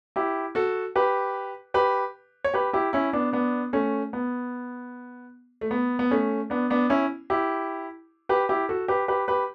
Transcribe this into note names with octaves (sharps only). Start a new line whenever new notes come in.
E4 G4
F#4 A4
G4 B4
G4 B4
C#5
G4 B4
E4 G4
C#4 E4
B3 D4
B3 D4
A3 C#4
B3
A3
B3
B3
A3 C#4
B3 D4
B3 D4
C#4 E4
E4 G4
G4 B4
E4 G4
F#4 A4
G4 B4
G4 B4
G4 B4